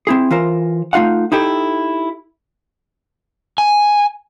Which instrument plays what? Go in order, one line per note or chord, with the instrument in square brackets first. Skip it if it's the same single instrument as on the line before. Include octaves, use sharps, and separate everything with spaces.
[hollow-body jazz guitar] C4 E4 G#4
E3 F4 A#4 C5
A3 D#4 F4 F5 F#5
D#4 E4 G4 A4
[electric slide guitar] G#5